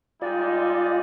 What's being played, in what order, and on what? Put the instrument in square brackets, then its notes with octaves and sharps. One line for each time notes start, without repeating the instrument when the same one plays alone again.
[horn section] G3 G#3 D#4 [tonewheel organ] F4 D5